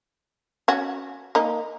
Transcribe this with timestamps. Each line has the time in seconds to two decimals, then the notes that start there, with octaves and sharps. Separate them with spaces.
0.68 C#4 F#4
1.35 A#3 D#4